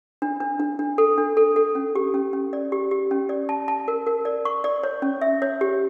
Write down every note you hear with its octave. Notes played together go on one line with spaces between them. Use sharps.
D4
D4
D4
D4
A4
D4
A4
A4
C#4
G4
C#4
C#4
D5
G4
G4
C#4
D5
A5
A5
A#4
A#4
D5
C#6
D5
C#5
C#4
E5
C#5
G4